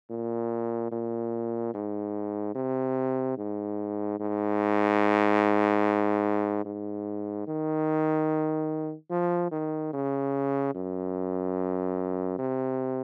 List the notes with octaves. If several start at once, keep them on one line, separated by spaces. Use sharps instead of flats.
A#2
A#2
G#2
C3
G#2
G#2
G#2
D#3
F3
D#3
C#3
F#2
C3